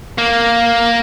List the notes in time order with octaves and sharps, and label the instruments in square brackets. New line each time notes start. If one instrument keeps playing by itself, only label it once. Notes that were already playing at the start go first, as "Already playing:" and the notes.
[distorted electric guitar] A#3